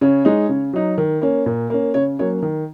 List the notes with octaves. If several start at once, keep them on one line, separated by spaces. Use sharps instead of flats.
C#3 C#5
G#3 D#4
C#3
F#3 D#4
D#3
A#3 C#4
A#2
A#3 C#4
C#3 C#5
F#3 A#3 C#4 C#5
D#3